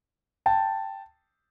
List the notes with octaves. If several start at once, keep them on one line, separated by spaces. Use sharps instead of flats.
G5 A5